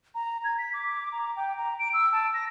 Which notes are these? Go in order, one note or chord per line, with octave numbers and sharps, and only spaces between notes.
A#5
G#6
B6
D6
A#5
G5
A#5
D7
E6
A5
A#6